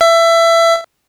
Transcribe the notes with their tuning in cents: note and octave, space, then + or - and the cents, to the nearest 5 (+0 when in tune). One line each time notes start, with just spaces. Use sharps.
E5 +20